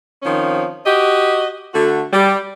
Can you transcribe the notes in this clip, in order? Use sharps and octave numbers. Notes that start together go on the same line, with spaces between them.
D#3 F3 C4 C#4
F#4 G4 D#5
D3 A3 F#4
G3